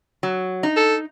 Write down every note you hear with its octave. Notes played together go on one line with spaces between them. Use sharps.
F#3
D#4
A4